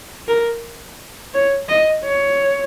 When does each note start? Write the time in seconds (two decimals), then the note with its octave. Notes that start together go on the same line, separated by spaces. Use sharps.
0.28 A#4
1.34 C#5
1.69 D#5
2.04 C#5